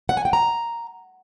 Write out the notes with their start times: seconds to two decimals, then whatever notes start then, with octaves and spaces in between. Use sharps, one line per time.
0.09 F#5
0.17 G#5
0.25 G5
0.33 A#5